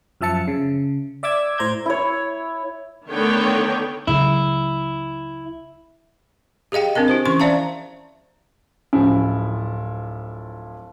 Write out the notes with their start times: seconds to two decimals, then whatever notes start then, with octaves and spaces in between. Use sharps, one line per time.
0.21 F#2 F3 E5 A5 C#7
0.48 C#3
1.23 D5 E5 D6 E6 G#6
1.58 A2 C5 A#5 G6 G#6
1.86 E4 C#5
3.09 D3 D#3 A3 B3 C#5 G5
4.07 C#2 C#3 F#3 E4
6.72 G4 G#4 D#5 F5 G5
6.95 C4 D4 A#4 D#5
7.08 E4 G4 C5
7.26 E3 C#4 C6 C#6
7.40 C5 D5 E5 F5 A5 A#5
8.93 D1 F3 C#4 E4